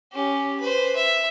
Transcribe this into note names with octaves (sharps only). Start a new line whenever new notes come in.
C#4 G4
B4 C5
E5